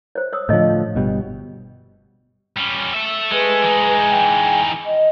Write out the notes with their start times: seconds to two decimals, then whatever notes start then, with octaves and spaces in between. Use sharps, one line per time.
0.15 C5 C#5
0.33 C#5 D#6 E6
0.49 A2 D3 F3 C#5 D#5
0.95 G1 B2 G3
2.57 G3 C#4
2.93 A4 E5
3.32 G#3 B4
3.63 E3 D#4
4.09 G5
4.85 D#5